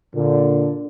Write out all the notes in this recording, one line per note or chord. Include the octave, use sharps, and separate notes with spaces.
A#2 D3